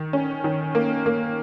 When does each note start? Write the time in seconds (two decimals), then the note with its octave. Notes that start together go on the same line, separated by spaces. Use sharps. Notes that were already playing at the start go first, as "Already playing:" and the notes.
Already playing: D#3
0.13 C#4
0.44 D#3
0.75 A#3
1.06 A#3